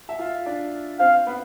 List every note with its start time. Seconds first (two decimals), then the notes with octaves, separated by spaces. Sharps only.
0.09 E5
0.19 F4 F5
0.46 D4 D5
0.99 C4 C5 F5
1.27 B3 B4